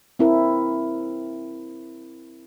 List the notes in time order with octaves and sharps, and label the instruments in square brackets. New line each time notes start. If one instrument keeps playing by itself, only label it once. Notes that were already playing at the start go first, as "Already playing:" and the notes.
[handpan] C4 E4 A#4